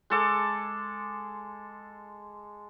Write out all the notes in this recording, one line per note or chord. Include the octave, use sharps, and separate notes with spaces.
G#3 A4 D6